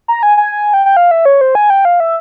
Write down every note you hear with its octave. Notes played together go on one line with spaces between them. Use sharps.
A#5
G#5
G#5
G#5
G5
G5
F5
E5
C#5
C5
G#5
G5
F5
E5